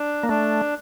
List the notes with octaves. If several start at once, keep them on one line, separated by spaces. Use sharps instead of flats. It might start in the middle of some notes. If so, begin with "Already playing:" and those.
Already playing: D4
A#3
A3 D4